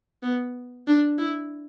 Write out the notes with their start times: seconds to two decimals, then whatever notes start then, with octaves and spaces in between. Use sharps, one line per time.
0.23 B3
0.87 D4
1.18 E4